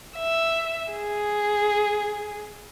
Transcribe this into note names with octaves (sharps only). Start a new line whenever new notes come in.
E5
G#4